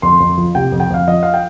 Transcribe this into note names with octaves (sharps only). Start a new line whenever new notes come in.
F2 C6
F2
F3
C3 G5
F2
G5
F2 F5
F3 D#5
F5
G5